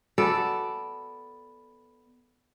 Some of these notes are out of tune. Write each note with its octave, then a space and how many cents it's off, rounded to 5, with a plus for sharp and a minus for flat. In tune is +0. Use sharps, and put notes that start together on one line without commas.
B3 +0 A4 +0 D5 +0